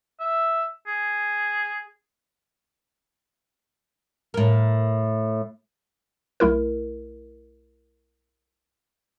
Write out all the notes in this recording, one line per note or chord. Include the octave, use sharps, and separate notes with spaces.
E5
G#4
A2 A#4
B1 A3 E4 A#4